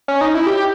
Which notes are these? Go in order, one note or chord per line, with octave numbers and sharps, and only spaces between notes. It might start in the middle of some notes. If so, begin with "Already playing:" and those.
C#4
D#4
E4
G4